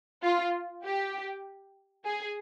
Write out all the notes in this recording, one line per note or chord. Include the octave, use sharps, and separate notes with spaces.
F4
G4
G#4